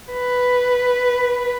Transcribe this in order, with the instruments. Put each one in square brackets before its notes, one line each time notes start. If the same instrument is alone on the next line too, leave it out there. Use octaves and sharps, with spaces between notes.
[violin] B4